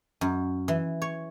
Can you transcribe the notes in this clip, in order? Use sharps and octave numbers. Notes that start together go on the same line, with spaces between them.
F#2
E3
C#5